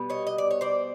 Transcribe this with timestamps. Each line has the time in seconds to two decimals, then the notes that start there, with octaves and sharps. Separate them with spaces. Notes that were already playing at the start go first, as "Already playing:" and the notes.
Already playing: B2 G3 B3
0.10 C#5 D#5
0.27 D#5
0.38 D5
0.51 C#5
0.61 C5 D5